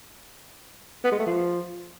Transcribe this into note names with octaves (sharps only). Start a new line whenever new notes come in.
B3
G#3
A3
F3